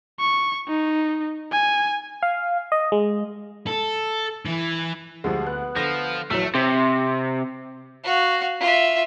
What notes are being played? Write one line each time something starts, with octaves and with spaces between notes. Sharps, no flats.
C#6
D#4
G#5
F5
D#5
G#3
A4
E3
D2 F3 G3 G#3
B3 F#6
D3 F3 A#6
A#1 E3 F#3 A3 E6
C3
F#4 F5
F4 E5